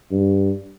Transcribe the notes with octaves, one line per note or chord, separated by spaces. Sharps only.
G2